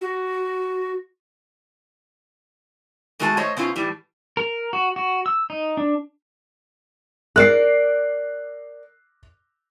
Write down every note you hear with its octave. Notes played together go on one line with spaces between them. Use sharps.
F#4
B2 G#3 A3 F#4 A#4 A5
A3 C5 C#5 D#5
B2 C4 C#4 F4
A2 E3 G3
A#4
F#4
F#4
E6
D#4
D4
A#4 D5 F#6 C7